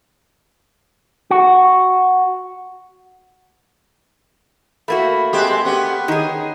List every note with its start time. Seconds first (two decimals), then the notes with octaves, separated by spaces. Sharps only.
1.31 F#4
4.88 A3 A#3 F#4 B5
5.33 G#3 C4 G4 F#6
5.65 B3 C#4 G4
6.08 D#3 D#4 G#4